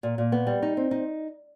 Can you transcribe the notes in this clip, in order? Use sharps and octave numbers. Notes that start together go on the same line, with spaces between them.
A#2
A#2
B3
G3
D#4
C4
D#4